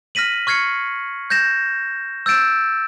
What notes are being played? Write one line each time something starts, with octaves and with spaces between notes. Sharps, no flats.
F6 A#6 B6 D#7 F#7
C#6 F6 G#6 C7 C#7
G6 G#6 A#6 E7
E6 G6 A6 D7 E7